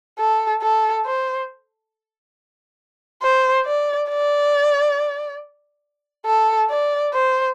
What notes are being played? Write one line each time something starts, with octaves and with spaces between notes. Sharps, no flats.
A4
A4
C5
C5
D5
D5
A4
D5
C5